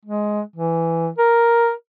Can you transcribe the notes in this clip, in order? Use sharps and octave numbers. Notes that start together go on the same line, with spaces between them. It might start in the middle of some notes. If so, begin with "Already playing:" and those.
G#3
E3
A#4